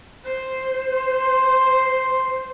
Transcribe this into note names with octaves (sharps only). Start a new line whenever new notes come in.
C5
C6